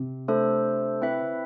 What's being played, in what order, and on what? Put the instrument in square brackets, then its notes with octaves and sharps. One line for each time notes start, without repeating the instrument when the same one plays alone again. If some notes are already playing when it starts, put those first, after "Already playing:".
Already playing: [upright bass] C3
[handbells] A3 D4 A4 C5
C4 E4 B4 E5